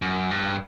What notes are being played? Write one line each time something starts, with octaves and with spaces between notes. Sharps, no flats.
F#2
G2